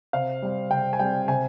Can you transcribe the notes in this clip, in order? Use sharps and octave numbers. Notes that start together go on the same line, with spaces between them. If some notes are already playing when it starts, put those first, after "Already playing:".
C3 F5
G3 C4
C3 G5
G#5
G3 C4 G5
C3 G#5